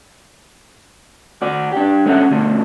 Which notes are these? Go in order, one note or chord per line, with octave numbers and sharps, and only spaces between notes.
F#4 D5
D4 G4
G#3 B3 C#4 A4 E5 F#5
D2 B2 D4